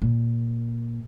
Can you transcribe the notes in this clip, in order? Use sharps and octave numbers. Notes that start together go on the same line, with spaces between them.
A#2